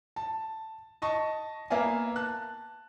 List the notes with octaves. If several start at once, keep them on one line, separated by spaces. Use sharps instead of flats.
A5
D#5 A5 C#6 D#6
A#3 B3 E5 F5 G#5
A5 F#6